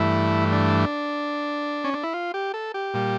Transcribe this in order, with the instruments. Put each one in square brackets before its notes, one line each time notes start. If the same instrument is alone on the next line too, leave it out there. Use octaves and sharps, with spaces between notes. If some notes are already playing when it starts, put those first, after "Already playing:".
Already playing: [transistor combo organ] G2 E3 A3 E4
D4
C#4
D4
E4
F4
G4
A4
G4
A#2 G3